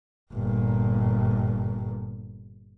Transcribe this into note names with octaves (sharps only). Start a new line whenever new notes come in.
G1 A#2